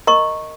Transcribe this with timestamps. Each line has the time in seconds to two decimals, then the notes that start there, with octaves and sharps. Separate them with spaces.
0.07 A#4 D#5 A#5 C#6